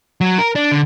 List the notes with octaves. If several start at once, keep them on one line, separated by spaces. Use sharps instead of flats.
F#3
A#4
D4
D3